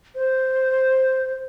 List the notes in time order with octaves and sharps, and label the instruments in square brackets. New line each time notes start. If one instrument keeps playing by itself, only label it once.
[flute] C5